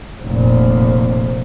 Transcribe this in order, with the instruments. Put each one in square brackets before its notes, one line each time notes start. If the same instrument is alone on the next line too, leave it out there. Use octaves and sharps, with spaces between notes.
[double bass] F1 A#2